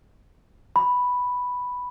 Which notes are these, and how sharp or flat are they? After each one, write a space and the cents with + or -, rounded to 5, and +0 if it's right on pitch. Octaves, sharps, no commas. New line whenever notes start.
B5 +0